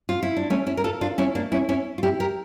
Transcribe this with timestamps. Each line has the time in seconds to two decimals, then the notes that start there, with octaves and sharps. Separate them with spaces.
0.09 F4
0.23 E4
0.37 D4
0.50 A3 C#4
0.67 C#4 E4
0.77 A#4
0.84 F4 A4
1.01 D4 F4
1.18 C#4 E4
1.35 A#3 D4
1.52 C#4 E4
1.69 C#4 E4
1.98 F4
2.03 E4 G4
2.20 G4 A#4